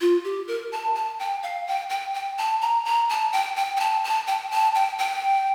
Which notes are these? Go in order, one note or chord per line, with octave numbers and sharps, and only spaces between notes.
F4
G4
A#4
A5
A5
G5
F5
G5
G5
G5
A5
A#5
A#5
A5
G5
G5
G5
A5
A5
G5
A5
G5
G5